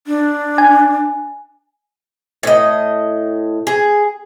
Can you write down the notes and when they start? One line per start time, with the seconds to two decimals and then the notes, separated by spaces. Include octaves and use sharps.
0.07 D4
0.58 G#5
2.43 A2 D#5
3.67 G#4